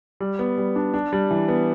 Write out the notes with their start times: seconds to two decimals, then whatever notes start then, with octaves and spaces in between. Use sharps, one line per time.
0.20 G3
0.39 B3
0.58 G3
0.76 D4
0.94 D4
1.13 G3
1.31 E3
1.49 B3